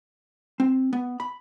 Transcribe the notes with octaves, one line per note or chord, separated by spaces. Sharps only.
C4
B3
B5